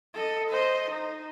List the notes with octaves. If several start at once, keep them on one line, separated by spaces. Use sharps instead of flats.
A4 D#5
C5 D#5
D#4